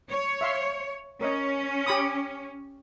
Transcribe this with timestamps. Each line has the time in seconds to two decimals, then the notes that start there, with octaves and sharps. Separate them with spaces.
0.11 C#5
0.41 E5 F5 C6
1.21 C#4 A#4 C#5 D#5
1.86 G4 B5 D#6